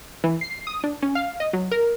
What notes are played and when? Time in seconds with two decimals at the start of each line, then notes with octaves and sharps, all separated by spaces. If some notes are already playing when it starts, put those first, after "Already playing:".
0.24 E3
0.41 C7
0.67 D#6
0.84 D4
1.02 C#4
1.15 F5
1.40 D#5
1.53 F#3
1.71 A#4